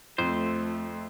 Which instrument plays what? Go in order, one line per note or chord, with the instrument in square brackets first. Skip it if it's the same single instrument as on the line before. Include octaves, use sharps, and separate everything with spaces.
[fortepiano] F2 [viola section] F3 A3 [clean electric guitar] C5